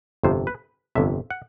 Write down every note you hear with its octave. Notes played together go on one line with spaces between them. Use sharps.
G1 F2 C3 C5
B4
G1 F2 C3 E5
F#5